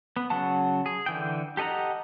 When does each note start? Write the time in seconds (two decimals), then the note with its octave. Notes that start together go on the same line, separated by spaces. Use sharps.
0.16 B3
0.30 C#3 F#3 F#5 A5
0.86 G#4
1.06 D3 E3 G5
1.57 G4 A4 D#5 F#5 A#5